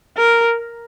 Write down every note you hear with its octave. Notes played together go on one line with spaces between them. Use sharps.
A#4